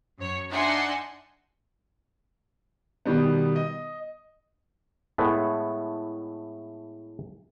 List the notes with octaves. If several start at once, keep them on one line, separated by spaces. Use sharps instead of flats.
F#2 C#5
D4 D#4 E5 F#5 G#5 C6
B2 D#3 G3 B3
D#5
A2 G#3 A3 B3